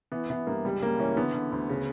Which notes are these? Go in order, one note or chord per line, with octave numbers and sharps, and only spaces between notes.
E3 B3
E3 B3
G2 A#3
C#2 G3
C#3 A#3
E3 C#4
D3 B3
D3
D2
C#3